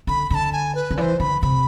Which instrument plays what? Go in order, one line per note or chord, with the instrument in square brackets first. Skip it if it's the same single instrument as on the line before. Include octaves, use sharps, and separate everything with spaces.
[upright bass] D3 [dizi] B5
[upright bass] D3 [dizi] A5 B5
[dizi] G#5
B4
[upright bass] D3
[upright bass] E3 [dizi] C5 D5
[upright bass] D3 [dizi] B5
[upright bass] C3 [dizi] B5